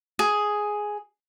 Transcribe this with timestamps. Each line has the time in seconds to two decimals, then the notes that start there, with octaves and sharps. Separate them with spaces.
0.19 G#4